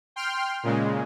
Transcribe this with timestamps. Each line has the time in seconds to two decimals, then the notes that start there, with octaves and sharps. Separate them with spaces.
0.16 G5 C6 F6
0.63 A#2 C#3 G#3